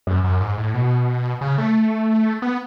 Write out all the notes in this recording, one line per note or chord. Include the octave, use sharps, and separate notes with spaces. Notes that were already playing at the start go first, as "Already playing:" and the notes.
F#2
F#2
G#2
A2
B2
C#3
A3
B3